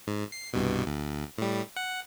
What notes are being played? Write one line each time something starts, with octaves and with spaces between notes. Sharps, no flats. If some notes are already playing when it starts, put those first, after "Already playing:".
G#2
C7
C2 G2 B2
D2
A2 G3
F#5